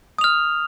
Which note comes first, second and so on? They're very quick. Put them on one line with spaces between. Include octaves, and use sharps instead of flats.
D#6 F7 F6